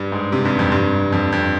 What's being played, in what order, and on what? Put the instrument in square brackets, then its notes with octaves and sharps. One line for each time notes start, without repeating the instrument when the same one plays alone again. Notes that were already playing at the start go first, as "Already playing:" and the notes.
Already playing: [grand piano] G2
G#2
C3
G2
F2
G2
F2
F2